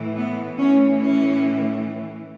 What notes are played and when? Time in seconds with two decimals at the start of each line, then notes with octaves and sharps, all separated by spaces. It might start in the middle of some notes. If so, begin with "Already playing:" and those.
Already playing: A2 E3
0.16 B3
0.58 A2 E3 C#4
0.99 C#4